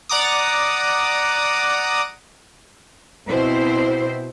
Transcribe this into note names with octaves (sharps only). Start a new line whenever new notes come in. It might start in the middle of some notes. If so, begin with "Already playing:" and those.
D5 F#5 A#5 D6 D#6
B2 C4 E4 C5